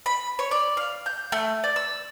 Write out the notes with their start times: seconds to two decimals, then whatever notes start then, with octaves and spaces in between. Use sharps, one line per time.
0.06 B5
0.39 C#5
0.51 D5
0.77 F5
1.06 G6
1.32 A3
1.64 D5
1.76 E6